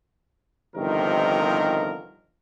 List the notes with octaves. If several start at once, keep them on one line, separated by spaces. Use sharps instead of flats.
G1 C3 D#3 F3 D#4 A#4